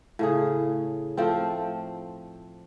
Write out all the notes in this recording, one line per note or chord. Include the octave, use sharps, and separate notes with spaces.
A2 C#3 G#4
F3 A3 C4